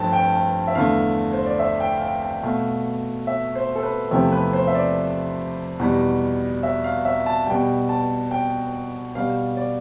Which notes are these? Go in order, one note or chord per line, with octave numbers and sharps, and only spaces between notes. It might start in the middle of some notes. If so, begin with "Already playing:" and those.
Already playing: G2 F3 A3 F5 G5 A5
G5
G5
E5
E2 D3 A3 F5
C5
D5
E5
G5
F5
G5
G5
B2 A3 F5
E5
C5
A4
B4
E2 C3 F3 A3 G4
B4
C5
E5
D5
E2 B2 G3
E5
F5
E5
A5
B2 G3 G5
A5
G5
B2 G3 F5
D5